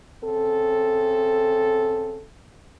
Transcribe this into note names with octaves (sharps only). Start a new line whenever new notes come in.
C#3 C4 A4